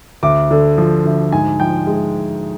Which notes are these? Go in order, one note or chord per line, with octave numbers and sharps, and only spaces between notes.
D2 D6
D3
F3
D2
G#2 G#5
F3 G5
G#3